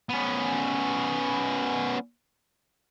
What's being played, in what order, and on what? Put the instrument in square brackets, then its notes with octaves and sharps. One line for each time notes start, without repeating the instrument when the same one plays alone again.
[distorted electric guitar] B3 C#4